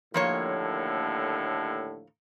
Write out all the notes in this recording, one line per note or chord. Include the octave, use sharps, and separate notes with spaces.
D#2 A2 D3 F3 A#3 C#5